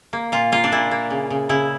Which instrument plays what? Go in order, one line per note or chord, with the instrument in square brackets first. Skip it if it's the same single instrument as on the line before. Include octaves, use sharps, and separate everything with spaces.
[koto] A#3
A#2 F4
A#3 F4
D4
A#2 E4
A#3
C#3
C#3
C#3 E4